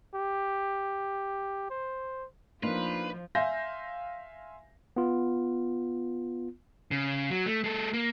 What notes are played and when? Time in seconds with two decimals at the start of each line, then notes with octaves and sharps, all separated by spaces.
0.15 G4
1.70 C5
2.63 F3 A#3 D4 D#4 F4 B4
3.35 E5 F5 G#5 C6 G6 A#6
4.96 B3 F4
6.91 C#3
7.30 F#3
7.46 A3
7.64 G#3 A4
7.93 A#3